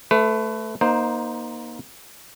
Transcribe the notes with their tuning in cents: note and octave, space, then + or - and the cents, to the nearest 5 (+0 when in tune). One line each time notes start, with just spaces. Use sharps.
A3 +0 B4 +30
A#3 +25 D#4 +0 C5 +0